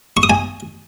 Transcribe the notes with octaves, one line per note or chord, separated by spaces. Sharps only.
C#6
D#6
G#5